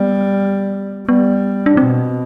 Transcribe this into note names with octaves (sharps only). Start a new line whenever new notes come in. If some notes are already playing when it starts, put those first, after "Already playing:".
Already playing: G3 B3
G3 B3
D4
B2 C4